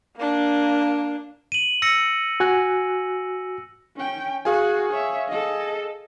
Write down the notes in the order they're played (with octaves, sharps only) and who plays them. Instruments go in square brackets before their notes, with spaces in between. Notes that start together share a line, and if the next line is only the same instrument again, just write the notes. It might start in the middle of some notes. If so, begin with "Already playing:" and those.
[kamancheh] A#3 D4
[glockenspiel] D#7 F#7
E6 A#6 C#7
[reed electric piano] F#4 G#5 F#6
[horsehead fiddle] C#4 G5
[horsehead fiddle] F#4 [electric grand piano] G#4 F5 G#5
[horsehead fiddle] C#5 E5
A4 D#5